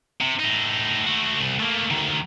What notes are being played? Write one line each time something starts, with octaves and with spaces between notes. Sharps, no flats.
C3
A2 D#4
A3 F#4
C2
A3 A#3
D2 D#3